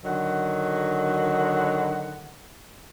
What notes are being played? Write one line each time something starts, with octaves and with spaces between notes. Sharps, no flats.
D3 D#3 F#3 F#5